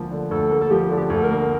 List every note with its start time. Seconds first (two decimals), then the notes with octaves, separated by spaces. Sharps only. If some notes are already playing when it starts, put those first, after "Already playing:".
Already playing: D2 D3 F3 A#3
0.11 D3
0.31 D2 A4
0.51 A#3
0.61 A4
0.71 F3 G4
0.90 D3
0.97 G4
1.10 D2 A4
1.24 A#4
1.29 A#3